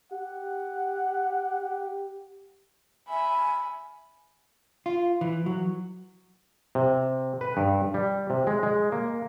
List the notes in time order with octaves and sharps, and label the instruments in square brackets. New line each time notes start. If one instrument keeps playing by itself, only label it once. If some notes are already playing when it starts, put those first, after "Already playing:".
[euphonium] G4 [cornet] F#5
[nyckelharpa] E5 B5 [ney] G#5
[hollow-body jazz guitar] F4
E3
F#3
[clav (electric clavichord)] C3
B4
G2
G3
C3
G#3
G#3
A#3